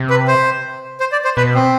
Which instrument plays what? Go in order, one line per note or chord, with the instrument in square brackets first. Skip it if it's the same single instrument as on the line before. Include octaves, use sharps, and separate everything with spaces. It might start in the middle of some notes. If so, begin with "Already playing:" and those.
Already playing: [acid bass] C3
[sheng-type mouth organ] B4
C5
C5
D5
C5
[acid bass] B2 [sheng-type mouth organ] B4
[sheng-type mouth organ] C4